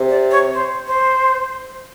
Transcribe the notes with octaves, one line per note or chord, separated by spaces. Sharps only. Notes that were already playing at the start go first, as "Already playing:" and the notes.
Already playing: C3
D5
C#5
C5
C5